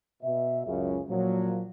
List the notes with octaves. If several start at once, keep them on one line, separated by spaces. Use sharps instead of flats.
B2 E5
C#2 F#2 C#3
A#2 F3 F#3